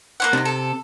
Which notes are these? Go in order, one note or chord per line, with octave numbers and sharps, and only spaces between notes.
A#3 C#4 F#5
C3 D4 D#4
A4